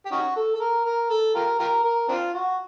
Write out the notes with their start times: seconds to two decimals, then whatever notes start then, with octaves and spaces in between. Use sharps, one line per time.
0.06 G4
0.11 C#4 D#4 F#4
0.36 A4
0.55 A4
0.60 A#4
0.85 A#4
1.10 A4
1.35 F4 G4 A#4
1.59 F4 G4 A#4
1.84 A#4
2.09 C4 D4 F4
2.33 F#4